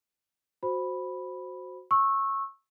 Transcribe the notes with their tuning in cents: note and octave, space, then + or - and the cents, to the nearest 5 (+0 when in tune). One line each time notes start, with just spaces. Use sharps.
F#4 -10 C5 -5 B5 +0
C#6 -20 E6 -5